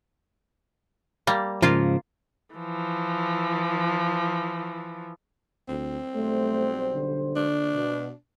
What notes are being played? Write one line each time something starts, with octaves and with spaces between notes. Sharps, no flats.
G3 A#3
G#2 C#3 F3 A#3 F4
E3 F3
D2 C4
B1 G3 A3 C5
D3
D4
B2